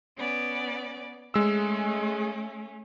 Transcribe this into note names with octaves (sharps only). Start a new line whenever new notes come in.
B3 C#4 D5
G#3 A3 C#4 E6